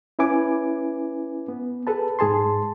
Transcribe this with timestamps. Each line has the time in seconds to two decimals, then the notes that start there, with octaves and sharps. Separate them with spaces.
0.19 C#4 E4 B4 G#5 D6
1.48 B3
1.87 G#4 A4 B4 A5
2.19 G#2 G#4 A5 C6